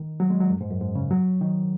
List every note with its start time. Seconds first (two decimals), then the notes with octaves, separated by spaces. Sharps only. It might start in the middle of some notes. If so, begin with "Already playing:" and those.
Already playing: D#3
0.20 F#3
0.30 G#3
0.40 F#3
0.50 F#2
0.61 G#2
0.71 F#2
0.81 G#2
0.95 C#3
1.10 F#3
1.41 D#3